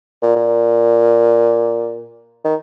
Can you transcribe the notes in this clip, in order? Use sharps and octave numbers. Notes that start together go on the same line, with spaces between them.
A#2
A#2
D#3